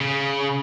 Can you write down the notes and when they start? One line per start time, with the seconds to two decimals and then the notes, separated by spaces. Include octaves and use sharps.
0.01 C#3